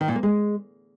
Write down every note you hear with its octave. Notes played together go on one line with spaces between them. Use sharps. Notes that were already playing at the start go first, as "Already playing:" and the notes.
D#3
A#2
A#3
G#3